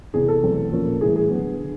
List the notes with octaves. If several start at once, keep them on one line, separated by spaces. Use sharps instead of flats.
E2 C3 E3 G#4
A4
E2 B2 F#3 A3 C4
A#2 F3 A#3 C#4
A2 E3 G3 G#4
G#4
D3 F#3 B3
D3